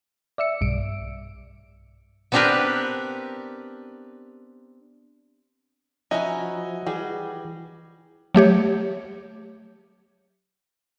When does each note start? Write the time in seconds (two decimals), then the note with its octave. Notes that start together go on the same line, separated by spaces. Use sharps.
0.38 D5 E5 E6 C#7
0.61 B1 G2 D7
2.32 B3 C4 D4 G4 A#4 B4
6.11 F3 C#4 D#4 E4 F#4 D#5 E5 G#5
6.86 E3 G3 F#4 G#4
8.35 F#3 A3 G4 C#5